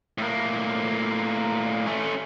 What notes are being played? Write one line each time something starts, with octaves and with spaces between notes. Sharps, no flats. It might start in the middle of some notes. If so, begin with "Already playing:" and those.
A2 A#3
A3 C#4